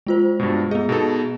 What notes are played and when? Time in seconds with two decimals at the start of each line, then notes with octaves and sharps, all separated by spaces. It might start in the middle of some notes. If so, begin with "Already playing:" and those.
0.07 G#3 F4 C5
0.40 G2 B2
0.71 B3 G#4 D#5
0.89 B2 D#4 A4